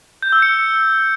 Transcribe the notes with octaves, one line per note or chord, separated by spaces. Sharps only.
G6
E6
C#7